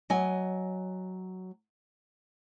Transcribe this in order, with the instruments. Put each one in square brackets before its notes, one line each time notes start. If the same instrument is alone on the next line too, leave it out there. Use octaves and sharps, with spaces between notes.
[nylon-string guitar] F#3 D#5 G#5